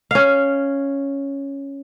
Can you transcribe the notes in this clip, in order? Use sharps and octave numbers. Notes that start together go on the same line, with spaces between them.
C#4 F5